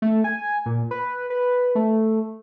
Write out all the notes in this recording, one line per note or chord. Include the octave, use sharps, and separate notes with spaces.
A3
G#5
A#2
B4
B4
A3